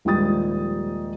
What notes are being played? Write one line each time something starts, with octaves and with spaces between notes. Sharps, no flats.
D#1 G#2 F3 G3 D#6 A6